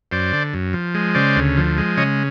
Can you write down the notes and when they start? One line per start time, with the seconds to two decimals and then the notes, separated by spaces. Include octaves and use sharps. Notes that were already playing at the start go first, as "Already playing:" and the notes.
0.11 F#2 C5 D5
0.33 D3
0.54 F#2
0.73 F3
0.95 G#3
1.15 C#3 C5 D5
1.36 D2
1.57 F3
1.78 G#3
1.97 C#3 C#5 D#5